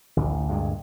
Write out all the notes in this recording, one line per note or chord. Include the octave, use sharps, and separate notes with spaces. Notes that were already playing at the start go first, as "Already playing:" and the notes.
A1 D2
D2 G2 A#2 G#3